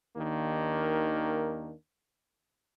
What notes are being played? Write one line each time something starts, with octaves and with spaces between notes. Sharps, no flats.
D#2 D#3 A#3 D4